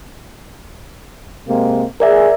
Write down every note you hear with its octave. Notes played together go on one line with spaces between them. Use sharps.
C3 G#3 A#3
G#4 A#4 D5 E5